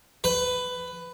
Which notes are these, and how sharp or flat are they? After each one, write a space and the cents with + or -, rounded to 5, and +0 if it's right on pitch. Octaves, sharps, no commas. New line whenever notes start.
B4 +15